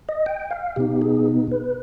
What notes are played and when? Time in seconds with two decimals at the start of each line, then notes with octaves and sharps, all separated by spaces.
0.09 D#5
0.26 G5
0.51 F5
0.76 B2 B3 D#4 G4
1.02 G#4
1.51 B4